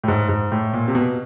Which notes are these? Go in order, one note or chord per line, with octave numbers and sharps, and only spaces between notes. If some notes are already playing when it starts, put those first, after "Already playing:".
A2
G#2
G#2
A2
A#2
C3
B2